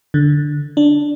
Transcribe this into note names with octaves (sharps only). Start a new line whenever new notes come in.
D3
D4